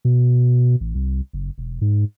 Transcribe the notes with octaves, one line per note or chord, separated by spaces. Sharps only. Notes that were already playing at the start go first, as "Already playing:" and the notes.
B2
A1
C2
F#1
E1
G#2